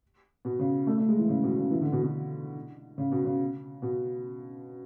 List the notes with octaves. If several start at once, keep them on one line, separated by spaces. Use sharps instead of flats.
B2
C#3
A3
A3
G#3
E3
C#3
B2
C#3
E3
D3
B2
B2
C#3
B2
C#3
B2